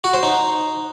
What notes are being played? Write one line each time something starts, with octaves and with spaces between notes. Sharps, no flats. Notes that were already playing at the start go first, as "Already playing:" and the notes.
F#4
C5
D#4